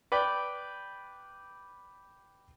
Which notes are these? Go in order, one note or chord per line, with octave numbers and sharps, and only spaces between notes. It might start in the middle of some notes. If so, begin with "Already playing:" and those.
B4 D5 G5